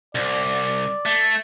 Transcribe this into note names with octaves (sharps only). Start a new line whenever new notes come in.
C2 D5
A3